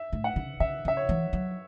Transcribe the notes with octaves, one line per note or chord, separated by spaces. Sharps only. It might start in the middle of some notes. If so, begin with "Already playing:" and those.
Already playing: E5
A2
F#5
C#3
C#3 E5
C#3 E5
C#5
E3
F#3